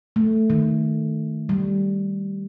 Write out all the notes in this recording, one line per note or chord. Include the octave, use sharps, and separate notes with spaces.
A3
D#3
G3